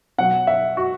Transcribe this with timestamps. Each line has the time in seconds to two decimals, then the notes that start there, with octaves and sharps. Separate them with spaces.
0.18 B2 F#3 F#5
0.47 E5
0.77 F#4